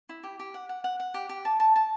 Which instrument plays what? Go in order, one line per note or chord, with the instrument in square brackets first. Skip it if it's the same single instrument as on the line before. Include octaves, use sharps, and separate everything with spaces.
[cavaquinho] E4
G4
G4
F#5
F#5
F#5
F#5
G4
G4
A5
A5
A5